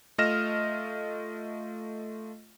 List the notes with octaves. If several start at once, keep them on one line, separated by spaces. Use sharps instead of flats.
A3 F4 D#5 F6 A#6 E7